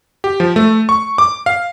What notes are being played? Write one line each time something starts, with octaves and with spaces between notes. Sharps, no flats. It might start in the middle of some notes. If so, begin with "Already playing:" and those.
G4
F3
A3
C#6
D6
F5